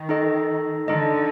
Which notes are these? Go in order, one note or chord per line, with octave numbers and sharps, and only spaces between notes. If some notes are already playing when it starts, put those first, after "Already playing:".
Already playing: D#3
D#4 A4 D#5
D3 D#4 A4 D#5